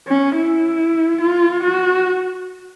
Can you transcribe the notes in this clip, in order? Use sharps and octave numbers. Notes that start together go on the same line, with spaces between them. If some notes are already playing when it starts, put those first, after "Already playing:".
C#4
E4
F4
F#4